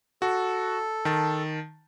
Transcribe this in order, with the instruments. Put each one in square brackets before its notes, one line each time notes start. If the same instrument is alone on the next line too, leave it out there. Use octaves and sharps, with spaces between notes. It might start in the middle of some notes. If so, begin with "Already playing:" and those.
[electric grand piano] F#4 [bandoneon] A4
[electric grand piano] D#3 A5